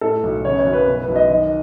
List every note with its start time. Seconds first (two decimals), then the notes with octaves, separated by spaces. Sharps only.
0.01 A2 A4
0.23 B1
0.45 C#3 C#5
0.59 C#5
0.66 F#2
0.73 B4
0.87 B2
1.01 B4
1.08 B1
1.16 D#5
1.29 D#3 D#5